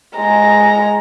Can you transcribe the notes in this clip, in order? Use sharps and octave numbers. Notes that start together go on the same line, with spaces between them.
G#3 A#5